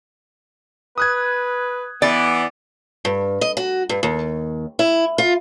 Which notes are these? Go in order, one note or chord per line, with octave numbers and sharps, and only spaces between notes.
B4 D#6 F#6 G#6
E3 B3 D5
G2
D#5
F#4
G2
D#2
E4
F4